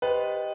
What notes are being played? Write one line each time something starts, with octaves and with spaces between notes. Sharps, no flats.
G4 B4 C5 D#5 G5